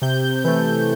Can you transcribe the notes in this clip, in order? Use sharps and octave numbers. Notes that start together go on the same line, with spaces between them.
C3 G6
E3 A3 G6